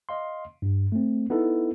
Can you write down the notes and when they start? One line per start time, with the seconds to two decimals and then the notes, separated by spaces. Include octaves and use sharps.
0.09 D#5 F5 C6
0.62 G2
0.92 A3 C4
1.30 B3 D#4 E4 A4